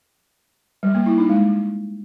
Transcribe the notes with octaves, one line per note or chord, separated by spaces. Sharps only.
G3
A#3
E4
D#4
G#3